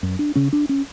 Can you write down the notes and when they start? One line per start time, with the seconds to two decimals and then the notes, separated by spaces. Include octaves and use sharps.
0.03 F#2
0.19 D4
0.35 C#3 C#4
0.53 D4
0.69 C#4